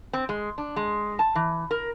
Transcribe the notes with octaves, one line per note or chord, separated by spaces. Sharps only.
C4
G#3
D4
G#3
A5
E3
A#4